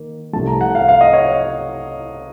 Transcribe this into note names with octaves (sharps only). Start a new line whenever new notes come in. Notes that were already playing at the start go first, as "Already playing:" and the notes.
Already playing: D#3 A#3
C2 C3 F3 A3 A5
A#5
F#5
F5
F5
D#5
C#5